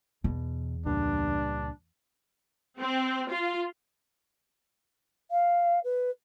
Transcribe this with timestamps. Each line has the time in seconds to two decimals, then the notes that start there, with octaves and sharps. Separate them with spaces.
0.24 E2 B2
0.86 C#2 G2 A#2 D4
2.79 C4
3.29 F4
5.31 F5
5.84 B4